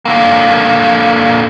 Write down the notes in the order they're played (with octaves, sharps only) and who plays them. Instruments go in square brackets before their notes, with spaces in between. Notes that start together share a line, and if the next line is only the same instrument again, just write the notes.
[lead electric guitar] D3 A#3